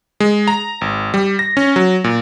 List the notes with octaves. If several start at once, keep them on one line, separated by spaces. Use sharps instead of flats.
G#3
A#5
G#1
G3
A#6
C#4
F#3
A#2